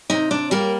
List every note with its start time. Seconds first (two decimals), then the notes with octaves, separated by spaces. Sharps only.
0.10 C3 D#4
0.31 D4
0.51 G3 A#3 A#4